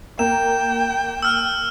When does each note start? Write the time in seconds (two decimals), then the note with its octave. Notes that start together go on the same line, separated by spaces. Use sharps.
0.19 A#3 G5 E7
1.23 E6 F6